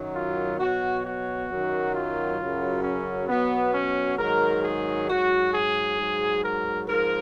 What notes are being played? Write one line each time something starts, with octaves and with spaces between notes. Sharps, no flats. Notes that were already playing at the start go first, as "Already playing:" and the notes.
Already playing: F#2 D#3 F#3
F4
B2 F#3 F#4
F#4
F#2 D#3 F#3
F4
F#2 C#3 F#3
C#4
B2 F#3 B3
C#4
G#2 D#3 F#3 A#4
G#4
G#2 F#3 F#4
G#4
G#2 F#3
A#4
G#2 F3 A#4